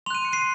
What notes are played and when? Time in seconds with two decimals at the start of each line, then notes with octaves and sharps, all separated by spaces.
0.06 C6 F7
0.10 F#6 D#7
0.25 C#7
0.33 C7 D#7